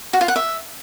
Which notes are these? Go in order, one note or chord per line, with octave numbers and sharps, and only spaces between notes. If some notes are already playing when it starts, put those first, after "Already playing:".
F#4
F4
F#5
E5